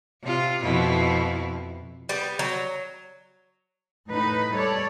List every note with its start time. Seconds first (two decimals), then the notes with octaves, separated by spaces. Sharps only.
0.22 C3 F4
0.63 F2 B2 E4
2.09 G3 B3
2.39 F#3
4.10 A2 D#4 B4
4.54 G3 A4 C#5 D5